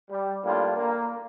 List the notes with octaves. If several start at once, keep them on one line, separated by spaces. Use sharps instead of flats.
G3
A2 G3 A#3 D4 F4
A#3